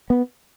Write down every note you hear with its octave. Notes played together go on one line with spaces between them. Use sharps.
B3